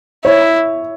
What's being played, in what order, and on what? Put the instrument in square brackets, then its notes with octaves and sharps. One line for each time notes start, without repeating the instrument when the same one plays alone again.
[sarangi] E4 [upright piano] C#5